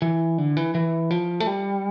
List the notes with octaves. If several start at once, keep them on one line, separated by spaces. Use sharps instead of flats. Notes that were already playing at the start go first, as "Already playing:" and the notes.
E3
D3
E3
E3
F3
A3
G3